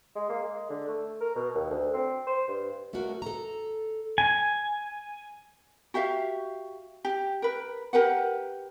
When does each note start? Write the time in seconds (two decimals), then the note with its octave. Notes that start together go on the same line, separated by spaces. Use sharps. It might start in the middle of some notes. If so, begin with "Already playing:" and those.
0.15 G#3
0.30 A#3
0.42 G#3
0.70 D3
0.88 A3
1.21 A#4
1.36 B2
1.55 D#2
1.70 D2
1.93 C4
2.27 C5
2.48 G2
2.93 B2 A3 A#3 C#4 F#4 A#4
3.22 A4 A#5
4.18 G#5
5.94 F#4 G4 E5 F5
7.05 G4
7.42 A#4 B4
7.93 G4 A#4 B4 F#5